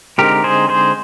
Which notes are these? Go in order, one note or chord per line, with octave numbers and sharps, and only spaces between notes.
D3 G#3 C4 D#4 G4 A#4
G#4 C5
G#4 C5